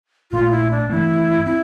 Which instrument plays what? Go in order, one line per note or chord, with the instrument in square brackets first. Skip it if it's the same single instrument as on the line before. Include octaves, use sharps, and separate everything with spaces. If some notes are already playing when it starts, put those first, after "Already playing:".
[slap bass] A#1 A#2 A3 [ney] F4
[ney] E4
D4
[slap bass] G2 E3 A3 C4 [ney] E4
[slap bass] C4 [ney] E4